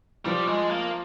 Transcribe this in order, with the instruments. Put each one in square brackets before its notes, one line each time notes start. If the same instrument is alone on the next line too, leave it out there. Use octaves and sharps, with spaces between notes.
[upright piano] F3 [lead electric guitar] G3
[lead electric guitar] G#3
A#3